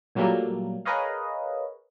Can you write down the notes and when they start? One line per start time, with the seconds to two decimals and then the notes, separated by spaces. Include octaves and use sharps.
0.15 A#2 F#3 G3 A3 A#3
0.85 G#4 A#4 B4 C#5 D#5 F5